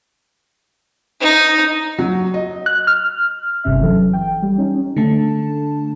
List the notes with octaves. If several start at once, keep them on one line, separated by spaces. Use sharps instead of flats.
D#4
F#3
D#5
F#6
F6
G1 G2 C3 C#4 E5 F6
E3 F#3 A4
G5
G3
C#4 D#4
D3 A3 A5